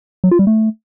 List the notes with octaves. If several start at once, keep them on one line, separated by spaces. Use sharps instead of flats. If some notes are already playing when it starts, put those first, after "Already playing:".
F#3
F4
G3
A3